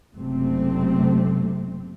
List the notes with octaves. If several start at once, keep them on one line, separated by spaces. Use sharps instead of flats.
F#1 C3 A3 C4